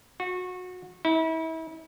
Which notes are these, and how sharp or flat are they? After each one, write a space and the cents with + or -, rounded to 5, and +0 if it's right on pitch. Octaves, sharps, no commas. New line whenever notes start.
F#4 -25
E4 -35